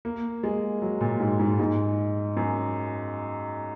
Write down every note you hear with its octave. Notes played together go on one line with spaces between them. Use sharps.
A#3
G#3
F#3
A#2
G#2
G#2
G#2
F#2